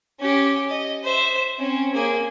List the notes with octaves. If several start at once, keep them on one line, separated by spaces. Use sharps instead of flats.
C#4 G4
D#5
C5 E5
C4 C#4
A#3 G#4